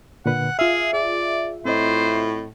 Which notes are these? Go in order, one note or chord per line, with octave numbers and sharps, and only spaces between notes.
A#2 D3 B4 F#5
F4 G#4 E5 F6
G#4 D5
A2 C4 C5 D#5